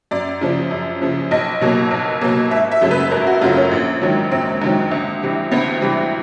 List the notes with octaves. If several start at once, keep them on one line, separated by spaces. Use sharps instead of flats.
F#2 D5
C#3 F3
F#2
C#3 F3
B1 D#5
B2 F#3 A#3
B1
B2 F#3 A#3
G#1 E5
E5
F#2 C#3 F#3 A3
B4
G#1 A#4
F#4
F#2 C#3 F#3 A3 F4
C#4
A#1
G#2 D#3 F#3
A#1 C4
G#2 D#3 F#3
D2
C3 E3 G3
D2 B3
C3 E3 G3